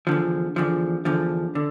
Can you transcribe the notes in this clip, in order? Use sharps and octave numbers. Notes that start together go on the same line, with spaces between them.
E2 D3 F3
E2 D3 F3
E2 D3 F3
D3